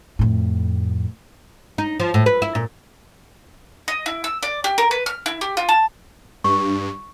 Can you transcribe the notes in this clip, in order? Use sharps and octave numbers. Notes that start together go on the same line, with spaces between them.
F2 A2
D#4
F3
A2
B4
E4
A#2
D#5
E4
E6
D5
G4
A#4
B4
F6
E4
G4
F4
A5
G2 C#6